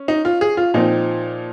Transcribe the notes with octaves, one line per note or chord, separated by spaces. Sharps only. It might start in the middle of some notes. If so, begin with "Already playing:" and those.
Already playing: C#4
D#4
F4
G#4
F4
A#2 F3 C4 D#4